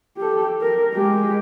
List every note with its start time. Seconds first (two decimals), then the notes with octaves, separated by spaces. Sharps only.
0.17 G4 A4
0.62 A#4
0.94 G#3 G4